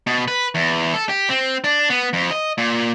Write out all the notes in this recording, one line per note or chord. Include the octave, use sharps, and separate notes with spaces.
B2
B4
E2
A4
G4
C4
D4
B3
F2
D#5
A#2